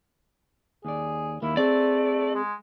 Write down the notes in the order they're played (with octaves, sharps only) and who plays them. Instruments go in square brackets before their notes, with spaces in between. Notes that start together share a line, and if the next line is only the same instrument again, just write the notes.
[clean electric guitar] D#2 D5 [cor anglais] G#4
[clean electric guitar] D#2 A#3 [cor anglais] E4
[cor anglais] A3 [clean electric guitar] C4 [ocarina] G#4 [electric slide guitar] D5
[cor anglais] G#3